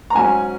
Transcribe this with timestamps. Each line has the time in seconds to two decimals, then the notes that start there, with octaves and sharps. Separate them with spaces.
0.10 A#5
0.15 G#2 F#3 C#4 G#5